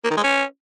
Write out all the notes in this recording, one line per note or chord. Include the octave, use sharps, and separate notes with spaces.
A#3
D#3
G#3
C#4